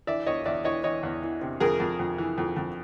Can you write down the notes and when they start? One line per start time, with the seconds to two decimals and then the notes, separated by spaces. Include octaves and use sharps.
0.07 E3 D5 E5
0.26 E2 C#5 D#5
0.45 E2 D5 E5
0.65 E3 C#5 D#5
0.84 E3 C#5 D#5
1.03 E2
1.22 E3
1.41 C3
1.60 F2 G#4 A#4
1.80 F2
1.99 F2
2.18 E3
2.38 F2
2.56 F2